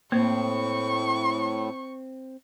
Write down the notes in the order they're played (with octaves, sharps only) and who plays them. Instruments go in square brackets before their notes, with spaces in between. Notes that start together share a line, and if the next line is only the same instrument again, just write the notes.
[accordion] A2 [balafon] A#3 C5 [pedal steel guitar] C4 [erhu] C#6